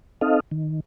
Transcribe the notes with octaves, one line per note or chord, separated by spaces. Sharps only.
C4 D#4 A4 D#5 F5
D#3